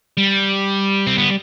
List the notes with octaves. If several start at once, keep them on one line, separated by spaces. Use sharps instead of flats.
G3
C4
B3